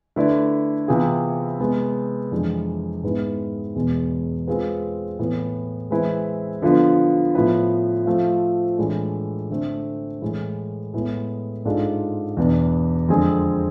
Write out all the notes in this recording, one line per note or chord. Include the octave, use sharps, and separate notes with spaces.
D3 A3 E4 B4 D5
C3 E3 B3 F4 G#4
C3 G#3 B3
F2 E3 G#3 D4 G#4
G#2 G#3 B3 E4 B4
E2 B2 G#3 B3
G#3 C4 F4 G#4 B4
A2 E3 B3
E3 G#3 C4 E4 B4
D3 F3 B3 F4 B4
A2 F3 B3 E4 B4
F3 A3 C4 F4
A2 E3 G#3 D4
D3 A3 C4
A2 E3 G#3
A2 G#3 B3 E4 G#4
G#2 G#3 D4 F4 A4
E2 B2 B3 D4
F2 D3 G#3 C4 G#4